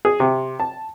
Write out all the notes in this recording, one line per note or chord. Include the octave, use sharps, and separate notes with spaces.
G#4
C3
A5